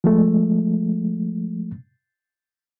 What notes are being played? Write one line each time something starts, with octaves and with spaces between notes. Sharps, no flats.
F3 G#3 A3